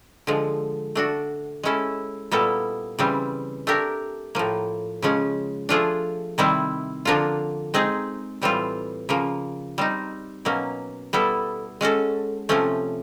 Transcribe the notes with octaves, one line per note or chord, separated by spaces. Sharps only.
D3 F3 G#3
A3 D4 F#4
G#3 C#4 E4 A4
A#2 G3 B3 E4 A4
C#3 E3 G3 C4
A3 D4 G4 A#4
A2 F3 A#3
C#3 F3 G#3 C#4
F3 A3 D4 F4 G#4
C3 D#3 G3 C4 E4
D3 F3 A#3 D4 F4
G#3 C4 D#4 G#4
A2 E3 G3 C4 F4
C#3 F3 A#3
G3 C4 D#4
B2 F#3 A#3 C#4
G3 B3 E4 A4
G#3 C#4 F#4 A4
C3 F3 A3 C#4